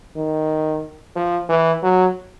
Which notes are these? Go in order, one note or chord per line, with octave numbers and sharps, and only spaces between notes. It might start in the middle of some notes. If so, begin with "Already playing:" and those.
D#3
F3
E3
F#3